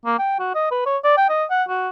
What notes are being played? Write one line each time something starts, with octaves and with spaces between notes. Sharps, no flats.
A#3
G5
F#4
D#5
B4
C#5
D5
G5
D#5
F#5
F#4